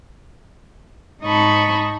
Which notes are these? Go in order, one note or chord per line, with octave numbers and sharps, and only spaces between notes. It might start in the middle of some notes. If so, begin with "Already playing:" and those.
G#2 D#4 D#5 A5 B5 C#6